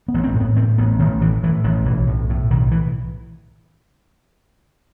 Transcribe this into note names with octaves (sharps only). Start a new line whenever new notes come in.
B3
A1
C4
A2
B3
A2 C4
A1 B3
A1 D#3
A2 E3
A2 E3
A1 D#3
B1 E3
A2
A2
B1 D#3
E3